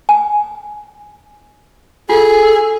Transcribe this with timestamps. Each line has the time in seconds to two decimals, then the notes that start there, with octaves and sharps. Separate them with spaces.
0.09 G#5
2.09 F4 G#4 A4